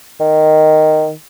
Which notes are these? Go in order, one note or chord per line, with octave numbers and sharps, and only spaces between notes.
D#3